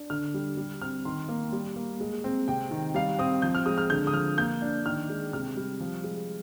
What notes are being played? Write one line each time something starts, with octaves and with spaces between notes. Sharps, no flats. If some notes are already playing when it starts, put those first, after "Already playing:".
Already playing: D4
D3 F6
G3
G3
C4 F6
D#3 C6
A#3
G3
A#3
G#3
C4
C3 G5
D#3
G3 F5
C4 D#6
F3 G6
F6
G#3 D#6
F6
D3 G6
D#6
F3 F6
A#3 G6
D4
D#3 F6
G#3
C3 F6
G3
F3
G#3